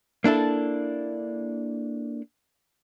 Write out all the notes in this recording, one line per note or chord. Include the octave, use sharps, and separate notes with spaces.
A#3 D4 E4 A4